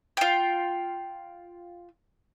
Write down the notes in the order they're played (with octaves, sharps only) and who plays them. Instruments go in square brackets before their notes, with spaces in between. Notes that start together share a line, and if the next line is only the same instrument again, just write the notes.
[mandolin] F4 G5